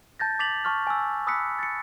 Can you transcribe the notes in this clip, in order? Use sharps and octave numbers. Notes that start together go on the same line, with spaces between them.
A5 G6 A6 A#6
D6 A6 B6 F7 F#7
A5 C#6 F6
G#5 E6
B5 D#6 E6 F#6 B6 C#7
A6 C#7